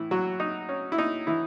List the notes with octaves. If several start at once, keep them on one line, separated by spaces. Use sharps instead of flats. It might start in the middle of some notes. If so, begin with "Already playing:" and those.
Already playing: A2 E3 E4
F#3 F#4
D#4
C#4
E4
D#4
E3 E4